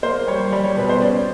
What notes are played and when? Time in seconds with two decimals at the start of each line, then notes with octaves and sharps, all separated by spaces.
0.03 A#3 C5
0.28 G3 C#5
0.52 G3 D5
0.64 C#5
0.77 B2 B4
0.89 C5
1.02 C#4 D5